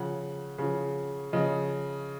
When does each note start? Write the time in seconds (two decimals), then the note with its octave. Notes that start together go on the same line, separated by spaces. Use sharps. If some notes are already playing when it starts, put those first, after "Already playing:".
Already playing: C#3 F3 F#5
0.58 C#3 F3
1.32 C#3 F3 D#5